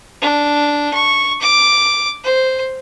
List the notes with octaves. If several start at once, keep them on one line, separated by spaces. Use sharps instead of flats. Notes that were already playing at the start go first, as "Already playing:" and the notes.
D4
C#6
D6
C5